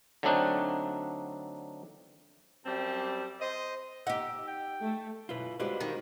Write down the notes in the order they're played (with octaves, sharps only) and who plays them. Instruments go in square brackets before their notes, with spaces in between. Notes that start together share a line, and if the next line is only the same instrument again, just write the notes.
[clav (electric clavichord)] D3 F#3 A3 C4 D4 D#4
[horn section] F#2 G3 C4 A5
C5 D#5
[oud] D#4 G4 [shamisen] F#5 [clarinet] E6
[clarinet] G5
[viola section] A3
[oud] F#2 B2 [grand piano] E4 [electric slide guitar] F4 B4
[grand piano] G3 G#3 F#4 [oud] C4 D4 D#4 [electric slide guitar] F4 B4
[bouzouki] D#3